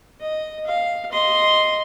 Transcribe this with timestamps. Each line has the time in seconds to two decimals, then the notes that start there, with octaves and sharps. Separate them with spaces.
0.20 D#5
0.67 F5
1.12 D#5 C6